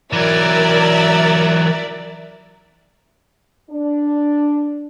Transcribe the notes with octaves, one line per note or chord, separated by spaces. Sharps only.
E3 F#3 A#4 D5 E5
D4